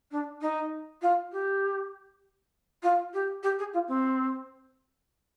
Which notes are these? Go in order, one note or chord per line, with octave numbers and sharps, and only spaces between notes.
D4
D#4
F4
G4
F4
G4
G4
G#4
F4
C4